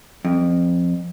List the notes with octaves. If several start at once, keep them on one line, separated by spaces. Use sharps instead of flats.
F2